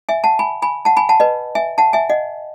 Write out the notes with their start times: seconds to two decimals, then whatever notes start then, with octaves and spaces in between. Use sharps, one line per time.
0.09 E5 G#5
0.24 F#5 A5
0.39 G#5 B5
0.62 G#5 B5
0.85 F#5 A5
0.97 G#5 B5
1.09 F#5 A5
1.20 B4 D#5
1.55 E5 G#5
1.78 F#5 A5
1.93 E5 G#5
2.09 D#5 F#5